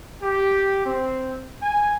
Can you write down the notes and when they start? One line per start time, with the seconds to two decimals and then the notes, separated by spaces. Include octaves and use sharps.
0.22 G4
0.85 C4
1.62 G#5